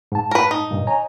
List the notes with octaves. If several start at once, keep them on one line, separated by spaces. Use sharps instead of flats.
G#2 A5
A#4 B4
D#4
G2 A#2 C#3
C#5 G#5 A#5